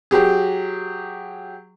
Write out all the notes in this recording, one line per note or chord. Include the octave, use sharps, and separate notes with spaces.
F#3 G4 G#4